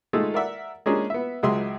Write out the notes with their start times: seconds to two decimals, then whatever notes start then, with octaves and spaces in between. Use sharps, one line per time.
0.13 D#3 G#3 A3 F4 G#4 A4
0.34 A#4 D5 E5 F#5
0.86 G#3 A#3 C#4 D4 G#4
1.10 B3 E5
1.43 C#2 F#3 G#3 G#4 E5 C6